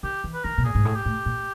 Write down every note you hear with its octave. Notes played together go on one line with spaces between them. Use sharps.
D#3 G4
E3
B4
D#3 A#4
B2
A#2 G#4
G#2
A2
G4
A2
A#2